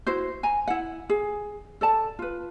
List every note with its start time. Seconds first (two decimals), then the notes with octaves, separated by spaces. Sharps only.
0.07 E4 F#4 C5
0.43 G#5 A#5
0.68 E4 F#5
1.09 G#4
1.81 A4 D5 A5
2.19 F4 B4